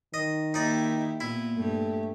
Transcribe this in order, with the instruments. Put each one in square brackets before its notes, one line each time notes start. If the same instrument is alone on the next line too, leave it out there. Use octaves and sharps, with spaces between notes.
[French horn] D#3 [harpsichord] D#5
[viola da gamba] A#3 E4 G4 [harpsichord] D#4 D5
[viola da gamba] A#2 A#3 B3 [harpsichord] E4
[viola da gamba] G2 G4 [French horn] A3